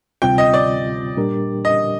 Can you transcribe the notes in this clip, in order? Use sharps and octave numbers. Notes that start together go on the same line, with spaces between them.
D2 C3 G3 C4 F4 G5
D#5
D5
A#2 G3 D4 G4 A#4
D#5